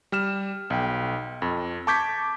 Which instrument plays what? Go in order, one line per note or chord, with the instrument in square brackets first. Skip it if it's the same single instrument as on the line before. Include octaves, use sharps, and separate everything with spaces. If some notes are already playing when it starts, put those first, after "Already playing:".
[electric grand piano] G3 F6 E7
B1 G5
F2
A5 C#6 D6 G6 G#6 B6